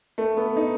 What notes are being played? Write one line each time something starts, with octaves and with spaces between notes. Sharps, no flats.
A3
B3
D#4